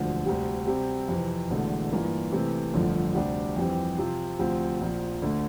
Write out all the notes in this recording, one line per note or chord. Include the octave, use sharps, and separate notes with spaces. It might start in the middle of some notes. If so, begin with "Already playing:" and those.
Already playing: E1 D2 D3 F3
D2 C3 G3
C3 G3 C4
F2 C3 E3
E1 E2 D3 A3
G2 E3 A#3 F4
C3 E3 A3 C4
G1 F2 D3 F3 A3
D2 C3 G3 D4 G4
F2 E3 G3 C4 G4
C3 F3 C4 F4
D2 C3 F3 C4 F4
A#1 A#2 F3
D2 D3 A3